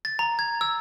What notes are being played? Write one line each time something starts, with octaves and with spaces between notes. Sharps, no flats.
A6
A#5
G#6
E6